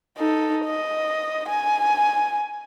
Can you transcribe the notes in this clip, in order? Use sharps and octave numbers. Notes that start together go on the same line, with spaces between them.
D#4 A4
D#5
G#5